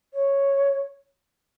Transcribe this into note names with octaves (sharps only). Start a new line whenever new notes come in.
C#5